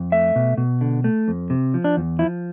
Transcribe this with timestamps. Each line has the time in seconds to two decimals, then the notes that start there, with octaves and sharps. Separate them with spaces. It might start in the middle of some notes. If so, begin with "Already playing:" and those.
Already playing: F2
0.12 A3 E5
0.36 B2
0.58 B2
0.81 D3
1.04 A3
1.28 F2
1.50 C3
1.74 F3
1.84 D4
1.97 E2
2.19 F3 E4